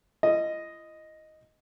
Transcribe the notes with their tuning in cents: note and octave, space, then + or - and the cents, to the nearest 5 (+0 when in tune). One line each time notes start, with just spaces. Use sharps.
E4 +45 D#5 +0